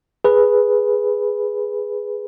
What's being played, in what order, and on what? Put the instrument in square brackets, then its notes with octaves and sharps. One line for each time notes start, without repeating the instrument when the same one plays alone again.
[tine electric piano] G#4 B4